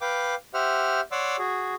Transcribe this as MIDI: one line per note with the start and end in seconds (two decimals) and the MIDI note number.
0.01 0.35 71
0.01 0.35 77
0.01 0.35 79
0.01 0.35 86
0.54 1.01 67
0.54 1.01 72
0.54 1.01 76
0.54 1.01 78
0.54 1.01 89
1.12 1.36 73
1.12 1.36 74
1.12 1.36 78
1.12 1.36 84
1.12 1.36 86
1.12 1.36 88
1.38 1.75 66
1.38 1.75 68